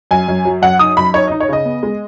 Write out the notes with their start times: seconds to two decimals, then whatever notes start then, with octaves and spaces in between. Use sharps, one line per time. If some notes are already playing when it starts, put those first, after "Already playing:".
0.11 F#2 G#5
0.28 F#2
0.45 F#3
0.62 F#2 F#5
0.79 D#4 D#6
0.97 F#2 B5
1.14 D#4 C#5
1.27 D#5
1.31 D#4
1.40 C#5
1.49 C#3 D#5
1.65 B3
1.83 G#3